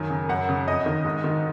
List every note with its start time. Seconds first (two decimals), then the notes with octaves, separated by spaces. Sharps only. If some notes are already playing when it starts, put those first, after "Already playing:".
Already playing: F#2 D#3 G#5
0.10 C#3
0.29 F#2 F#5
0.49 C#3
0.67 F2 D#5
0.86 D#3
1.05 G#2
1.24 D#3